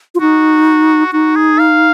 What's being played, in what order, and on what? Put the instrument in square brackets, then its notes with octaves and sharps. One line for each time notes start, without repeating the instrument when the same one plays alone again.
[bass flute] F4
[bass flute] D#4 [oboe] F#4
[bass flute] D#4 [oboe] F#4
[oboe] G#4
F5